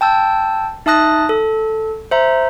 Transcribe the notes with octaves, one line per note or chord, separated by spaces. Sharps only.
G5 A5 E6 G6
D#4 E5 A5 D#6 F#6 A#6
A4
C5 E5 A#5